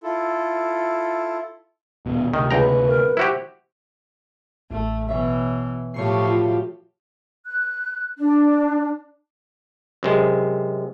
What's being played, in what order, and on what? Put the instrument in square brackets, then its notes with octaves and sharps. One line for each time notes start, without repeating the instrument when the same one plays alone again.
[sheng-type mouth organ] E4 F4 A4
[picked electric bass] D#1 B2
[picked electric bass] D2 C3 [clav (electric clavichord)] D#3
[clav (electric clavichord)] C#2 G5 A#5 [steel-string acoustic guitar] F#4 B4
[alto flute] A#4
[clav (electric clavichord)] E4 F#4 G4 [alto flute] C5
[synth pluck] A1 [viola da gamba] A3
[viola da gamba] B2 E3 [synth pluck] C#5 E5
[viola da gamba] A2 F3 G4 [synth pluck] C#5 C#6 C7
[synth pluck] F4 F#4
[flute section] F#6
D4
[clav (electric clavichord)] F#2 C3 G#3